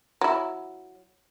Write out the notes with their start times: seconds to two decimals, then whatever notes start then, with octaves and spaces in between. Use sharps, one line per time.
0.21 F#3 E4